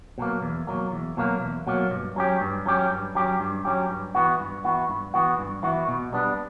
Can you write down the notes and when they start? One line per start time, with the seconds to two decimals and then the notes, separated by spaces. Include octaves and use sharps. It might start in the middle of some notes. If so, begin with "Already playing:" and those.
0.18 B2 F#3 A#3
0.43 E2
0.67 B2 F#3 A#3
0.92 E2
1.17 B2 F#3 A#3
1.42 E2
1.67 B2 F#3 A#3
1.91 G2
2.16 F#3 C#4 G4
2.41 G2
2.66 F#3 C#4 G4
2.90 G2
3.15 F#3 C#4 G4
3.40 G2
3.65 F#3 C#4 G4
3.90 G2
4.15 E3 B3 F#4
4.39 G2
4.64 E3 B3 F#4
4.89 G2
5.14 E3 B3 F#4
5.39 G2
5.63 E3 B3 F#4
5.88 B2
6.13 G3 B3 D4